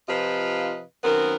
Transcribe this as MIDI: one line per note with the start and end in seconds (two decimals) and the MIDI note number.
0.09 0.82 48
0.09 0.82 53
0.09 0.82 65
0.09 0.82 71
0.09 0.82 75
0.09 0.82 77
1.04 1.36 42
1.04 1.36 51
1.04 1.36 59
1.04 1.36 60
1.04 1.36 70